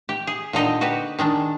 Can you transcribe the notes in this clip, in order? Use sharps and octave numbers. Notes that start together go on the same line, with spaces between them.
G4
G#4
A#2 D3 D#4 G4
F#4 G4 B4
D#3 G#3 D4